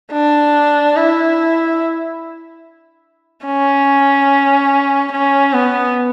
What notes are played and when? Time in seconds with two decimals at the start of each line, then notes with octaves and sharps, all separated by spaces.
0.12 D4
0.96 E4
3.45 C#4
5.12 C#4
5.53 B3